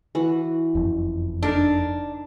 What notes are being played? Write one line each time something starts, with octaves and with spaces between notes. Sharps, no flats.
E3 F#4 F#5
F#1 F2
D4 D#4 A4 A#4